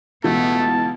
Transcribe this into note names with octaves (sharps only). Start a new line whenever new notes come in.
C#2 B2 E3 A3 B3 A5